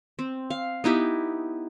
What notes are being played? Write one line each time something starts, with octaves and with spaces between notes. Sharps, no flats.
C4
F5
B3 D#4 E4 G4